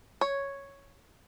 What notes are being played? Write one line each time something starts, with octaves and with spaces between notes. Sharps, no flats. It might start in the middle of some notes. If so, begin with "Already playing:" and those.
C#5